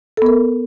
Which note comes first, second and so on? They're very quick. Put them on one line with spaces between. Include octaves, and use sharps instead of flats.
A4 B3 A#4